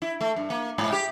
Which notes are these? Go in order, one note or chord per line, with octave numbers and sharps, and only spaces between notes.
E4
A3
G2
A#3
G#2
G4